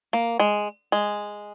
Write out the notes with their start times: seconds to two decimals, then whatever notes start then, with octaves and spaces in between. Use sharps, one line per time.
0.13 A#3
0.39 G#3
0.92 G#3